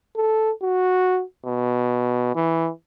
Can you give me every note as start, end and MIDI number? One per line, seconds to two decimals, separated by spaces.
0.16 0.51 69
0.62 1.22 66
1.45 2.30 47
2.35 2.69 52